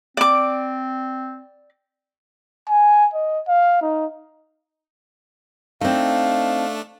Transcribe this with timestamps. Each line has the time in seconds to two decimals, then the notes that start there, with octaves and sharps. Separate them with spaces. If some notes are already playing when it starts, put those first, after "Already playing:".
0.17 C4 D5 D6
2.69 G#5
3.14 D#5
3.48 F5
3.82 D#4
5.81 A3 C4 D4 D#4 F5